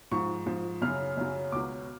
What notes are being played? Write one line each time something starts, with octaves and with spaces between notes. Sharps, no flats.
G#2 F3 C#6
G#2 F3
F#2 C#3 F#3 F6
F#2 C#3 F#3
C#2 B2 F#3 D6